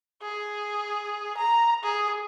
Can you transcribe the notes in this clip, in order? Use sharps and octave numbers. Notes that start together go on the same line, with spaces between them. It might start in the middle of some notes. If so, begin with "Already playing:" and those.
G#4
A#5
G#4